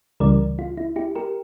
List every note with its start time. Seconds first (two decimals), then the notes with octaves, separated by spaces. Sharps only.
0.20 C#2 C#3 E3 G3 A#4 D5
0.59 F4
0.77 E4
0.96 E4 G4
1.15 G4 A#4